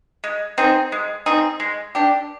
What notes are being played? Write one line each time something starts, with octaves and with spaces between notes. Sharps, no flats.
G#3
C4 D#4 G#4
G#3
C4 D#4 G#4
G#3
D4 G4